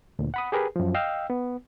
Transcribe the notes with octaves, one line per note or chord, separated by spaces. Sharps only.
D2 A#2
F#5 B5 D#6
G4 G#4 A#4 B4
F#2 F3
D#5 F5 G5 E6
B3